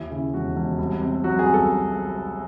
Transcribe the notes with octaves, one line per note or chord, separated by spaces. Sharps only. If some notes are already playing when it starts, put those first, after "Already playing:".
Already playing: D#2 E4
C#3 E4
E1 F#4
E1
C2
C3
F#3 F#4
G#4
C2
A4